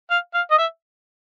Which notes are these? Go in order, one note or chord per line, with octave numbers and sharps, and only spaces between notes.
F5
F5
D#5
E5